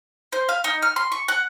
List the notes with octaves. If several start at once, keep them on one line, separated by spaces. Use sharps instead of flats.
C5
F5
D#4
F6
C6
C#6
F#5